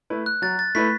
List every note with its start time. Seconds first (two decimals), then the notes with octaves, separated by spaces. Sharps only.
0.10 A3 E4 B4
0.26 F#6
0.42 F#3 A6
0.59 A6
0.75 A3 E4 B4 B6